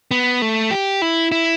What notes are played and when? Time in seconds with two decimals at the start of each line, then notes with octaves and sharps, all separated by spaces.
0.11 B3
0.42 A3
0.71 G4
1.02 E4
1.32 E4